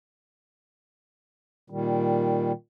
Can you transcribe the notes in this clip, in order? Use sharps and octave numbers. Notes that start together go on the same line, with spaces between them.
A#2 D#3 G3